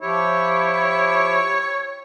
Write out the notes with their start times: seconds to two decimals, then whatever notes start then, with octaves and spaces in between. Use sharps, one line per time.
0.02 F3 E4 G4 C#5